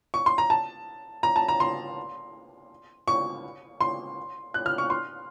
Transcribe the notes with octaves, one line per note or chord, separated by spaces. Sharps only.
C#6
C6
A#5
A5
A#5
A5
A#5
C6
C#6
C6
F#6
F6
C#6
C6